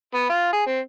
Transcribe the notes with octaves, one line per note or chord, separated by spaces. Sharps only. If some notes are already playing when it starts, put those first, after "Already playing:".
B3
F4
G#4
C4